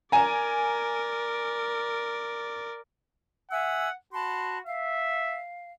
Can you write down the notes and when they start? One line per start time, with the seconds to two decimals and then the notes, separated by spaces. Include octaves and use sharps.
0.12 A#4 D5 G#5 A#5
3.51 E5 F#5 G#5 E6
4.13 F#4 A5 B5 C6
4.66 E5 F5